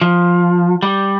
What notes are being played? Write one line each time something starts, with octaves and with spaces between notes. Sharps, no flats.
F3
G3